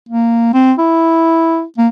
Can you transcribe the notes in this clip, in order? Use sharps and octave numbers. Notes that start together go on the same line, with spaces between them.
A#3
C4
E4
A#3